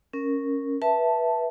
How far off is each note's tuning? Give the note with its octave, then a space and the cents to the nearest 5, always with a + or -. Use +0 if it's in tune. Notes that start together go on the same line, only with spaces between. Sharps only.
C#4 -5 A#4 -5
B4 -20 E5 +0 A5 +0